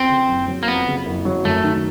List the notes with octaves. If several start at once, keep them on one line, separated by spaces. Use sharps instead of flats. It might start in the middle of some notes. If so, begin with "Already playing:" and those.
Already playing: F2 C4
C#3
F#1
F#3
A#3
F2 B3
C#3
F#1
F#3
F#2 A3
D#3